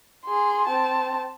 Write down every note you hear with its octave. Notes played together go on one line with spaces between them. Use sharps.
G#4 C6
C4 A5